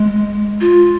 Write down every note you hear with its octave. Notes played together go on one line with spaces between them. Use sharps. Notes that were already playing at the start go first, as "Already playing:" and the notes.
Already playing: G#3
F4